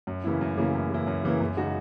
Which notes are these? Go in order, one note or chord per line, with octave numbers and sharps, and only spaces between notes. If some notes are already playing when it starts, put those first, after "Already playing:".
F#2
C#3 E3 A#3 E4
F#2
C#3 E3 A#3 E4
F#2
C#3 E3 A#3 E4
F#2
C#3 E3 A#3 E4
F#2
C#3 G#3 D#4 F#4